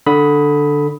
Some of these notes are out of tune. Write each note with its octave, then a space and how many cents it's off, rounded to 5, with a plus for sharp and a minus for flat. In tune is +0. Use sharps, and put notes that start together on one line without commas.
D3 +0 B5 +0 D#6 +20